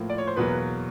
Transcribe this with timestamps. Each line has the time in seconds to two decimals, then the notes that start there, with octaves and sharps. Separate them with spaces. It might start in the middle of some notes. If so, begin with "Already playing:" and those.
Already playing: A2 F3 A#3
0.10 D5
0.18 C#5
0.27 C5
0.36 E2 B2 F#3 A#3 B4